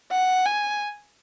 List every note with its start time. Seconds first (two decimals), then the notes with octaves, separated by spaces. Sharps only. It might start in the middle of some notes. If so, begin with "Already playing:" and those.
0.11 F#5
0.46 G#5